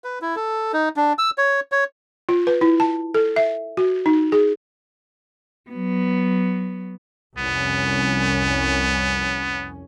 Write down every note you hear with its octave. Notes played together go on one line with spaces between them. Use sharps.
B4
E4
A4
D#4
D4
E6
C#5
C#5
F4
B4
E4
A5
A4
E5
F#4
D#4
G#4
F#3 B3
C2 F2 B3 C#4